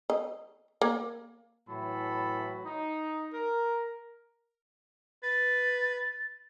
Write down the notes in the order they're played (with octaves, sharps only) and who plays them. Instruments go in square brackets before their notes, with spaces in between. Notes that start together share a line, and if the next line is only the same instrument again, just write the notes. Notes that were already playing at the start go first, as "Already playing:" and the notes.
[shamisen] D#5
A#3
[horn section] A2 E3 F#3 A4 B5
D#4
A#4
[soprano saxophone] B4 [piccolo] A6